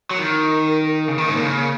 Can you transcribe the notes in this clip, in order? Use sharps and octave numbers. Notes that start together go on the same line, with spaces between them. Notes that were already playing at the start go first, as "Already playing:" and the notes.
F#3
D#3 A#4
C#3
D#3 A#3
G#2
A#2
C#3